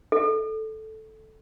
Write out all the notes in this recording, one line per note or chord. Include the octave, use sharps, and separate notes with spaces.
A4